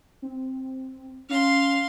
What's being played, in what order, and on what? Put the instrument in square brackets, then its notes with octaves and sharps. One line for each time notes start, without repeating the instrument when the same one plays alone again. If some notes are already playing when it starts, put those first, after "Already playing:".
[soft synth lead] C4
[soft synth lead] C#4 [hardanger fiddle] F5 C6